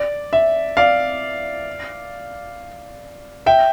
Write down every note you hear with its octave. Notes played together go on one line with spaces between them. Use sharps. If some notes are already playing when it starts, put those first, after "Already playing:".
Already playing: D5
E5
D5 F5
E5 G5